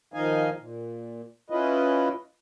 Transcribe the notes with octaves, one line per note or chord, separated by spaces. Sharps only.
D#3 F3 D#4 D#5 F5 G#5
A#2
C#4 E4 F4 B4 D#5